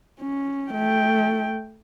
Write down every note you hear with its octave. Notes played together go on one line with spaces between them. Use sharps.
C#4
A3 G5